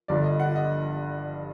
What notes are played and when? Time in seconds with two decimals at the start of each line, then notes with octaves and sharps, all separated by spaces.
0.08 G1 G2 D3 D5
0.24 D#5
0.40 F#5
0.56 D#5